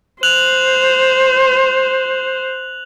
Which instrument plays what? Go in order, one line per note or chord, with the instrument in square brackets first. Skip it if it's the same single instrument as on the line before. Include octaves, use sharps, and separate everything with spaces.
[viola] C5 [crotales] F#6 F7 F#7